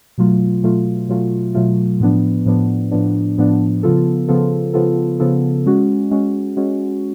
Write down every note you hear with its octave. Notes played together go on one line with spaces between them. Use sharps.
B2 F#3 A3 F4
B2 F#3 A3 F4
B2 F#3 A3 F4
B2 F#3 A3 F4
A2 F3 B3 D4
A2 F3 B3 D4
A2 F3 B3 D4
A2 F3 B3 D4
C#3 F3 B3 F4 A4
C#3 F3 B3 F4 A4
C#3 F3 B3 F4 A4
C#3 F3 B3 F4 A4
G#3 C#4 F#4
G#3 C#4 F#4
G#3 C#4 F#4